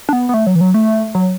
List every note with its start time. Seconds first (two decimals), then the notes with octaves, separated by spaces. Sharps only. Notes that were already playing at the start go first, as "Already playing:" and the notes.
0.09 D4
0.13 B3
0.29 B3
0.34 A3
0.47 F#3
0.55 E3
0.61 F#3
0.74 A3
1.15 F#3